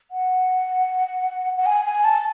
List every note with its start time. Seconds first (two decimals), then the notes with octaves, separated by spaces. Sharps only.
0.11 F#5
1.57 F#5
1.66 G#5
1.85 G#5
2.04 A5